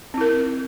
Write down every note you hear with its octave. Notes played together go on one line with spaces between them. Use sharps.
C4 E4 A#4